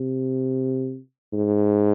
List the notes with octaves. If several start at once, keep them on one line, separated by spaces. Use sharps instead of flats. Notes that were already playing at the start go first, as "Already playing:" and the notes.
Already playing: C3
G#2